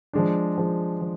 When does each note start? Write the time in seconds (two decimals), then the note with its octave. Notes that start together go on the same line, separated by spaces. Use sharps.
0.13 F3 G#3 D4
0.58 F3 G#3 D4
1.01 F3